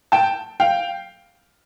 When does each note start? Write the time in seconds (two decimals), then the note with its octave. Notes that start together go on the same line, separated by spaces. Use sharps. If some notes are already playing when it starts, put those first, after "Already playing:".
0.12 G5 A5
0.60 F5 G5